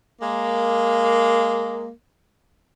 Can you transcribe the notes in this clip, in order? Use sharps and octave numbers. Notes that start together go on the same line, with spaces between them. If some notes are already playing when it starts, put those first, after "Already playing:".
G#3 A#3